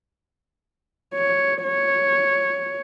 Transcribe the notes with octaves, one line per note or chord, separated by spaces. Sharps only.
C#5
C#5